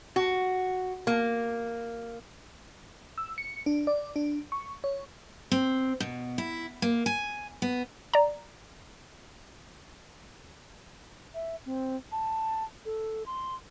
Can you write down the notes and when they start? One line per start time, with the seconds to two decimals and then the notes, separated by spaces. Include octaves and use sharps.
0.16 F#4
1.07 A#3
3.18 E6
3.38 C#7
3.66 D4
3.87 D5
4.16 D4
4.52 C#6
4.84 C#5
5.51 C4
6.00 B2
6.38 E4
6.82 A#3
7.06 G#5
7.62 B3
8.14 D5 A#5
11.34 E5
11.66 C4
12.12 A5
12.85 A4
13.26 C6